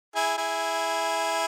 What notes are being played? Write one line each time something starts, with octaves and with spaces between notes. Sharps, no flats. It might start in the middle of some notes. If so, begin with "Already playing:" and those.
E4 G#4
E4 G#4